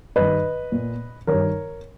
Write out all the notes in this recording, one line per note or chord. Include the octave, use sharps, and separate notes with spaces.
G2 D#3 B4 D#5
A#2
G2 D#3 A#4 C#5